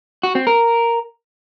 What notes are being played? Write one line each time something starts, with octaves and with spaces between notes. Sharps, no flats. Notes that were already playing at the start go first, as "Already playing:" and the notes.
F#4
C4
A#4